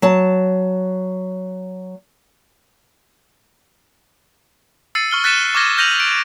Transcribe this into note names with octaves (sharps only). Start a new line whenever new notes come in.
F#3 A5
E6 A6 C7 C#7 D#7
C#6 F6 G7
F#6 A6 B6 C#7 D#7 E7
C#6 D6 F6 G#6 A#6
F6 G6 A#6 D#7 F7 F#7
D7